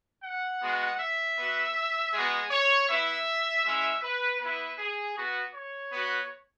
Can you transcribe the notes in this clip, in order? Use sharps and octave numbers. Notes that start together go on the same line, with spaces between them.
F#5
G#3 B3 F#4
E5
B3 F#4
G#3 B3 F#4 G#4
C#5
B3 E4 E5
G#3 C#4 E4 E5
B4
B3 E4 B4
G#4
B3 F#4
C#5
B3 F#4